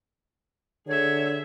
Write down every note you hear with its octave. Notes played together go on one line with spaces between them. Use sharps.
D3 G#4 C#5 E5